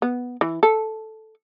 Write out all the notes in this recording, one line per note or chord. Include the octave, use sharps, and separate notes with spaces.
B3
E3
A4